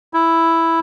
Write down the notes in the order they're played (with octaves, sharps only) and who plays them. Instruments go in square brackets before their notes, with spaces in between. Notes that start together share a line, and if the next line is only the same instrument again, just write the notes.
[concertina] E4